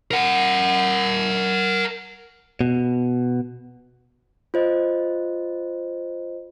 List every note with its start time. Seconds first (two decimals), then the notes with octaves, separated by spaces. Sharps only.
0.11 A#4 F#5
2.61 B2
4.54 F4 C5 D#5